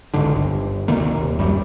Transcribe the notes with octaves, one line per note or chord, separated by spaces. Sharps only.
G#1 C#2 G#2 D3
G1
D2 C3 D#3 A#3
D#1
A#1 F#2 G3